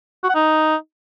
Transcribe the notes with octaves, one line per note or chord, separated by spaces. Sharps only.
F#4
F#5
D#4